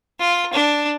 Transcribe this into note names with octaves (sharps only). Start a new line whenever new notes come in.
F4
D4